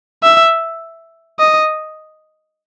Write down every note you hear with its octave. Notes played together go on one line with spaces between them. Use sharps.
E5
D#5